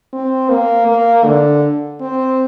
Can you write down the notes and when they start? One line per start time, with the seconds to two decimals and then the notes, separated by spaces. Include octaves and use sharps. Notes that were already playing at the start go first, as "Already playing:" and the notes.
0.13 C4
0.50 A#3
0.88 A#3
1.25 D3
2.01 C4